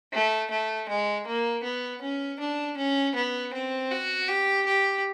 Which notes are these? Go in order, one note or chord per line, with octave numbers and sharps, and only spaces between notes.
A3
A3
G#3
A#3
B3
C#4
D4
C#4
B3
C4
F#4
G4
G4